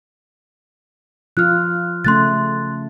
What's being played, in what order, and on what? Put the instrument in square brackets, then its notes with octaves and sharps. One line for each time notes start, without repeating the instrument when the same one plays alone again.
[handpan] F3 F4 [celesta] F6 F#6
[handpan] C#3 A3 C#4 [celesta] C6 F#6 A6